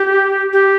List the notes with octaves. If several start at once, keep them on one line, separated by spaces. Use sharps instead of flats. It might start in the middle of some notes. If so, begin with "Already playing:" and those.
Already playing: G4
G4